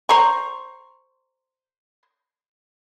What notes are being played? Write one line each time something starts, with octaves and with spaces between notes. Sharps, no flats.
C5 A#5 C6 C#6